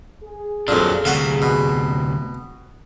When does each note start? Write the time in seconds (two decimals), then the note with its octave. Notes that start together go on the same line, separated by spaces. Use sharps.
0.24 G#4
0.68 F2 A#2 F#3 D4
1.05 D2 C3 F5 F#5 C#6
1.42 B2